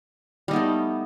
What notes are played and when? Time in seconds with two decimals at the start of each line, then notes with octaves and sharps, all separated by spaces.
0.48 G3
0.51 D#4
0.53 B3
0.56 A3